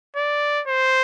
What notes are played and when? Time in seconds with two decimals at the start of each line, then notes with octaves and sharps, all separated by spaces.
0.16 D5
0.68 C5